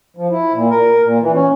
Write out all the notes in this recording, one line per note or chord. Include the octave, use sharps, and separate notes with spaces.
F3
E4
A#2
A#4
A#2
E3
C#4